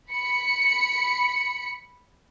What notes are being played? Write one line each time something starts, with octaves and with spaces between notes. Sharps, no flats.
B5 C#7